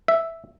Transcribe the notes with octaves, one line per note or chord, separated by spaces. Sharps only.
E5